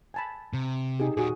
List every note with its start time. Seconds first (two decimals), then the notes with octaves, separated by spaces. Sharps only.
0.14 G#5 A5 B5
0.53 C3
1.00 D#4 G4 G#4
1.17 A#2 D#3 F#4 G#4